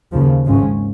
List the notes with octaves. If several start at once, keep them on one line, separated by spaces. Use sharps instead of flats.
D#2 C#3 F3
G#1 G#2 F3 G#3 C#4